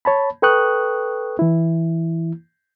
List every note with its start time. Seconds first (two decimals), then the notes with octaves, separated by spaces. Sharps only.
0.05 C#5 A5 B5
0.42 A4 B4 G5 C#6 D#6 F#6
1.39 E3 E4